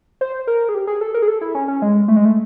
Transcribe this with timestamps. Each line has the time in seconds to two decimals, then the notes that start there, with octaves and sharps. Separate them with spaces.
0.21 C5
0.47 A#4
0.69 G#4
0.74 G4
0.87 G#4
1.01 A4
1.14 A#4
1.22 G#4
1.28 A4
1.41 E4
1.55 C#4
1.68 C#4
1.82 G#3
2.08 A3
2.16 G#3
2.25 A3